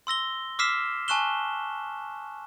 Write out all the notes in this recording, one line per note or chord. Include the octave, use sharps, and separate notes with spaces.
C6 E6 A#6 G7
D6 E6 F6 B6 C7 E7
G#5 A5 C#6 F#6 E7 G7